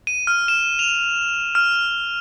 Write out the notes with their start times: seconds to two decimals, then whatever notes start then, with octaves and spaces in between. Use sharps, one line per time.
0.07 D#7
0.27 F6
0.48 E7
0.79 F7
1.55 F6